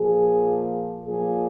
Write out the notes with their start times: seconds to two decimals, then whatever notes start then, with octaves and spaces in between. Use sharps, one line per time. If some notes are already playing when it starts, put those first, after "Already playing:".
Already playing: A#2 F3 G#4
1.05 A#2 F3 G#4